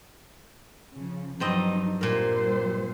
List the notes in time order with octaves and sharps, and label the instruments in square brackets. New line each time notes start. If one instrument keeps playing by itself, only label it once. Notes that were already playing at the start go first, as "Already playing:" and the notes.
[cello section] C#3 F3
[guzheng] G2 C4 D#5 [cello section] F3 F#3 D#4
[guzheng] A#2 A#4 [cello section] G3 C5